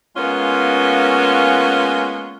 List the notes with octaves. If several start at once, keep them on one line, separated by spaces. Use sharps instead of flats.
G#3 A#3 B3 C#4 F4